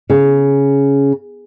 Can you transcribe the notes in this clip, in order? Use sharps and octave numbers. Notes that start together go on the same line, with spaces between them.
C#3